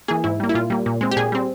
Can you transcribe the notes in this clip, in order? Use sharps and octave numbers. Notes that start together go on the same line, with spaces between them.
E3 A#3 G#4
G#2 E4
G3 A#3
E4
A#2 F4
G3 A#3
A#2
G#3 C4
G4
A#2 G#4
G3 C4